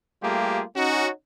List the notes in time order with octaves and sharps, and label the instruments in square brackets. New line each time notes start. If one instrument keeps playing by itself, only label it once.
[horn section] G3 A3 A#3 F4 G4 G#4
C#4 D#4 F#4